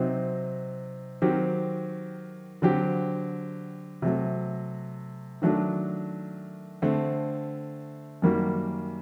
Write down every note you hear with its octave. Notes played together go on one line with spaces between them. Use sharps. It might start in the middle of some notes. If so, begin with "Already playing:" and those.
Already playing: C3 F#3 C4 D#4
D#3 F#3 C4 G4
D3 F#3 C4 G4
C3 F#3 A3
D#3 F#3 A3 D4
D3 A3 C4
F#2 D#3 G3 A#3 F#4